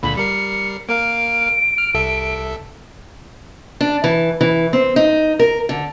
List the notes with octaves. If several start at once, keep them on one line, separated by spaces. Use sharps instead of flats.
C#2 A#2 D3 B5
G3 A#4 C7 C#7
A#3 A#4 F5 D7
F6
C2 A4 E5
D4
E3
E3
C4
D#4
A#4
D3